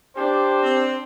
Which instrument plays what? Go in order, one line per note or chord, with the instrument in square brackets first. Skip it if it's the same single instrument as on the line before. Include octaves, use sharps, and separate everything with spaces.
[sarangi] D4 [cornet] G4 [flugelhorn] C5
[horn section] C4